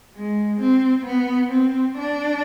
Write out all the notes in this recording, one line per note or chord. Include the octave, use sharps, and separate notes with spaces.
G#3
C4
B3
C4
D4